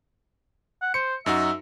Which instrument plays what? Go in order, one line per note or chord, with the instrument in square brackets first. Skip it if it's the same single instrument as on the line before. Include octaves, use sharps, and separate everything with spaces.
[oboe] F#5
[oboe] C5 [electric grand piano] C#7
[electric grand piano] F#2 D#4 F#4 [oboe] E5